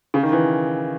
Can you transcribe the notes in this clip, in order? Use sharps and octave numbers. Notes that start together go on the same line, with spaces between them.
C#3
D#3
E3